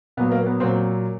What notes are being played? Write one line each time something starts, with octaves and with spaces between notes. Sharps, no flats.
A#2 F#3 B3
A#3
B3
A#2 F#3 C4